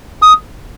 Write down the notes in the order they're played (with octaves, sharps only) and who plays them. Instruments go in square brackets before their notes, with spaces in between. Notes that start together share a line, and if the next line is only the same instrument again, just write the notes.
[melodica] D#6